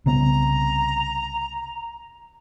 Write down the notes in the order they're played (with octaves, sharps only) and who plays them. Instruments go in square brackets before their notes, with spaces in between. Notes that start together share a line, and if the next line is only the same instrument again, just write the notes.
[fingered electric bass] C2 C#3 B3 [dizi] A#5